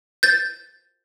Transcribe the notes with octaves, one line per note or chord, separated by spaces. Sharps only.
G6 A6